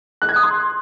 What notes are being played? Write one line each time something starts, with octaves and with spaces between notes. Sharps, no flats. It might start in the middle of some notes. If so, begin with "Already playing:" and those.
F#6
G#6
D#6
C6